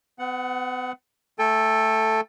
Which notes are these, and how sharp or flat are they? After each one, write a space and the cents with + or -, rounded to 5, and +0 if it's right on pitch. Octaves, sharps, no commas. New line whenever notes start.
B3 +40 F#5 +0
A3 +0 A4 +0 G5 +40